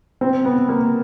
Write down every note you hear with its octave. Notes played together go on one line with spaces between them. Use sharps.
C4
B3
A#3